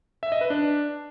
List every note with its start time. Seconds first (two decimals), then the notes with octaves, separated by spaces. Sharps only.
0.23 E5
0.32 D#5
0.41 B4
0.50 D4